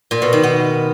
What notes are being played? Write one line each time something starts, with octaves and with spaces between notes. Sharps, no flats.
A#2
B2
D#3
B3